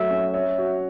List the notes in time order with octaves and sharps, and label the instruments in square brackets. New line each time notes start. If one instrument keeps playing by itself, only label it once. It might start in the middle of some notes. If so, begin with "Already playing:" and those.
Already playing: [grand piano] F#3 A3 [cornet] E5
[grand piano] C#4
[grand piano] C#5 [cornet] E5
[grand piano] F#4